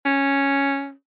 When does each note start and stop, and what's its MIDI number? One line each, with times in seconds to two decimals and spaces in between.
0.05 0.92 61